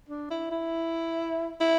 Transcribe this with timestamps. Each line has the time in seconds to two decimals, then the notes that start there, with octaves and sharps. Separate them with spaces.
0.09 D4
0.30 E4
0.51 E4
1.60 E4